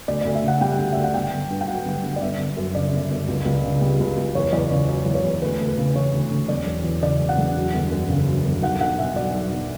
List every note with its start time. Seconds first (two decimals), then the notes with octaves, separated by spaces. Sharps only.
0.08 D2 D5
0.21 D2 D5
0.35 E5
0.43 C#3 F#5
0.61 G3 G5
0.79 D2
0.92 D2 E5
1.04 F#5
1.14 G1 G5
1.32 G1
1.50 G2
1.61 G5
1.68 F#3 F#5
1.86 G1
2.03 G1
2.16 D5
2.22 G1 E5
2.39 G1
2.57 F#2
2.75 C#3 D5
2.93 G1
3.10 G1
3.28 C#2
3.46 C#2
3.64 C#3
3.81 G3
4.00 C#2
4.17 C#2
4.35 E2 C#5
4.53 E2 D5
4.70 C#3 D5
4.88 F#3 D5
5.06 E2
5.15 C#5
5.24 E2
5.42 D2 B4
5.60 D2
5.68 B4
5.77 C#3
5.95 E3 C#5
6.13 D2
6.31 D2
6.49 E1 D5
6.66 E1
6.84 E2
7.02 C#3 D5
7.20 E1
7.29 F#5
7.38 E1
7.56 F#3
7.73 G1
7.91 F#2
8.09 C#3
8.27 F#3
8.44 G1
8.62 B1 F#5
8.81 B1 F#5
8.99 B2 E5
9.16 F#3 D5
9.34 B1
9.51 B1